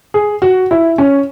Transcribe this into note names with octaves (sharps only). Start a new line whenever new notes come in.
G#4
F#4
E4
C#4